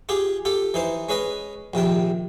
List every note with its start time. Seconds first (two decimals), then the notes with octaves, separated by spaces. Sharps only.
0.09 F4 G4 G#4
0.45 F4 G4 A4
0.74 E3 D#4 C5
1.09 G#3 C#4 B4 D#5
1.74 A#1 C3 D#3 G5